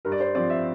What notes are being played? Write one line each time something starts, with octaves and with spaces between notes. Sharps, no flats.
G2 A#4
D5
C5
F3 C4 D5
E5